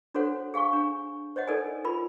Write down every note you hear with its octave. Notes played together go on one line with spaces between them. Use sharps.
D4 F#4 A4 C5 C#5 F#5
G#4 F5 G#5 C#6
D4
C5 C#5 D#5 F#5
D#4 A4 A#4 D5 G#5
F4 A#4 B5